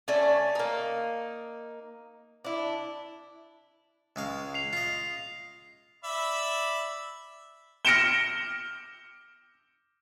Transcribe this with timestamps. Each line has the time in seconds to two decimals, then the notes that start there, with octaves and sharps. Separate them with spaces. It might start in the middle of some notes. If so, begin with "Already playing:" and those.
0.08 A3 C#4 D5 G#5
0.55 A#3 D#4
2.44 D4 E4
4.16 C#2 G#3 F5
4.54 C7 F7
4.73 F4 D#5 C7
6.04 D5 E5 B5
7.85 F6 A#6 C#7 D7 E7 G7